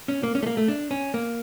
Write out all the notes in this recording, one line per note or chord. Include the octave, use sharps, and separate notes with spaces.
C#4
A#3
C#4
A3
A#3
A3
D4
C#4
A#3